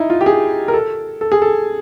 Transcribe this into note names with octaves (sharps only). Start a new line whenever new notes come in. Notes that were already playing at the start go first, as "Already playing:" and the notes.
Already playing: D#4 E4
F4
G4
G#4
A#4
A4
A4
G#4
A4